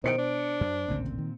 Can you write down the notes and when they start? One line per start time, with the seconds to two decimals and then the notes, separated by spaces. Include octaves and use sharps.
0.04 B2 D#3 C5 C#7 D7
0.18 D4
0.61 F#2
0.88 A1 D2 A#2 C#3 C4
1.18 D#3